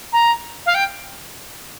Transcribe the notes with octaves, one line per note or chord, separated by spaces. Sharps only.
A#5
F5
G5